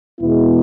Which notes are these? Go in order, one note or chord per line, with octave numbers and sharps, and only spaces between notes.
E2 B2 G#3 B3 E4